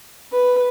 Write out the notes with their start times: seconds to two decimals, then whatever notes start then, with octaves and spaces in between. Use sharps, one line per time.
0.32 B4